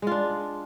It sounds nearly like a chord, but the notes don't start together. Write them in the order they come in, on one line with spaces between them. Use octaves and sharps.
G#3 F4 D4